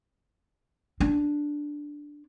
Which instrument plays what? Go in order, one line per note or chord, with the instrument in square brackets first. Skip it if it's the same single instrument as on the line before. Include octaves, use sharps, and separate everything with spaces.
[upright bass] D4